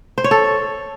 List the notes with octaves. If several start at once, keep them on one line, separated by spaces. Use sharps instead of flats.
C5
C#5
A4